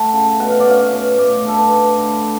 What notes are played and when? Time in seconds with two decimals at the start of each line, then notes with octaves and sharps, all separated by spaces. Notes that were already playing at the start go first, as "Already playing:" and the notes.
Already playing: A3 F#5
0.13 C#3
0.39 B2 F#5
0.50 F5
0.60 D5
0.66 C#4 F5
0.92 B2
1.18 A2 D5
1.45 D4 A4
1.58 B4
1.71 A2
1.98 D3